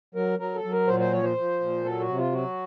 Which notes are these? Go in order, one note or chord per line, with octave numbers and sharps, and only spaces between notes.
F#3 A#4
F#3 A#4
A4
F#3
A#4
A#2 C5
C5
F3 C#5
C5
F3
A#2
F#3 A4
F#4
C3
F4
F#3 F#4